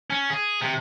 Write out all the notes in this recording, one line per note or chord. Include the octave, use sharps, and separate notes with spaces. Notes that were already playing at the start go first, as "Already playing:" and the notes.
C#4
G#4
C3